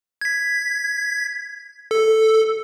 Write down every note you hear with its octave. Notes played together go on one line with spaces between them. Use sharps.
G#6 B6
A4